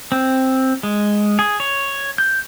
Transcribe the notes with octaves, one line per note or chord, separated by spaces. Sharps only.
C4
G#3
G#4
C#5
G6